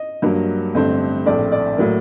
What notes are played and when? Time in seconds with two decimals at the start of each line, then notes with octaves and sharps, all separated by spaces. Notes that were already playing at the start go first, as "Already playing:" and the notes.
Already playing: D#5
0.22 G2 F#3 A#3
0.74 A1 G2 D3 A3 C4
1.26 A#1 A2 A3 C4 D5
1.52 D5
1.78 A2 F#3 A#3